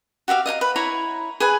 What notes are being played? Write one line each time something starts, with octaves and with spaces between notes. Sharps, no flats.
F#4 G4 E5 F5
D#5 F5 G5 A#5
B4
E4 C#5 A#5 B5
G#4 B4 G#5